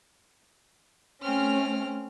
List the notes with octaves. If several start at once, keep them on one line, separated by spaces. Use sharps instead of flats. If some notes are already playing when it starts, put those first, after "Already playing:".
A3 C4 C#4 F6